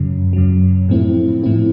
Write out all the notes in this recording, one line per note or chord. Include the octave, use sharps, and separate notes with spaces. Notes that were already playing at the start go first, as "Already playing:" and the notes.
Already playing: F#2 C#3 F#3
F#2 C#3 F#3
A2 F3 A3 C4 E4
A2 F3 A3 C4 E4